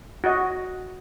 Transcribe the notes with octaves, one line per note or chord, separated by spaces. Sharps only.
F#4 D#5